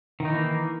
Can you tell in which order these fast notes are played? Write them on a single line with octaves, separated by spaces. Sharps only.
D#3 D#4 E3 A#3